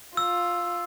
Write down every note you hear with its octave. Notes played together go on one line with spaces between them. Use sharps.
F4 E6